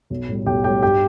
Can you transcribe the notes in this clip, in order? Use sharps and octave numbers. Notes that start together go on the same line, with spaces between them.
B1
A2 G3
B1 G4 G5
A2 G3 G4 G5
G2 G4 G5